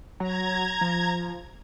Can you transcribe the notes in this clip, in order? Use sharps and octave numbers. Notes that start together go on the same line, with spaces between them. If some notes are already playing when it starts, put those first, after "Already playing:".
F#3 A#5 G#6
F3